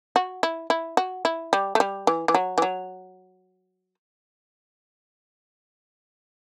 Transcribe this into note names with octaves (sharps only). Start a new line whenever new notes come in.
F#4
E4
E4
F#4
E4
G3
A3
G3
E3
E3
F#3
E3
F#3